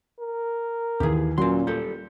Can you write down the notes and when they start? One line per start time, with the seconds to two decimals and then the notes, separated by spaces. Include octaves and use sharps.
0.20 A#4
1.00 D#2 E3 G4 G#4
1.38 A#2 F#3 C#4 C6
1.67 G3 A4 G6